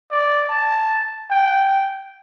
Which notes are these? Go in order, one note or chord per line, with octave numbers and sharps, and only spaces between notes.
D5
A5
G5